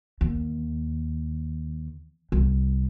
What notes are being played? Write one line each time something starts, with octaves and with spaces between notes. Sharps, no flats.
D#2
C2